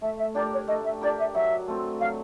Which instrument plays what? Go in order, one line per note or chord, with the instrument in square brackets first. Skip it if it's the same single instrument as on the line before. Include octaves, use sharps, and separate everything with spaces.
[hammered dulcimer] A3 [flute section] E5
[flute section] E5
[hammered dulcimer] D4 G4 A#4 [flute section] D5
[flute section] C#5
[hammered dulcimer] A3 [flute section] D#5
[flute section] E5
[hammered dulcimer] D4 G4 A#4 [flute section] D5
[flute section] E5
[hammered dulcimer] F#3 [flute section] E5
[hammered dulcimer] A3 C4
[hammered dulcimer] F#3 [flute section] F5